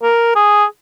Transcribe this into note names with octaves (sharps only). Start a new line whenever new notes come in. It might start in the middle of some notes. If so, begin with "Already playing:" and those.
A#4
G#4